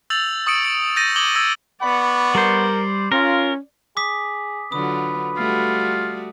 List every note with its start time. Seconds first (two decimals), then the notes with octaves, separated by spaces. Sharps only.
0.10 E6 G6 A6 F7 F#7
0.46 C#6 D#6 E6 C#7 D7
0.65 D7 F#7
0.96 G6 A6 A#6 D#7
1.16 D6 G#6 F#7 G7
1.35 E6 G#6 A#6
1.82 B3 D5 F#5 B5 C#6
2.35 G3 A#4 C5
3.12 C#4 F4 A#4
3.97 G#4 D6 D#6 B6
4.72 D3 F#3 F4 B4 D#6
5.37 G3 A3 F4 F#4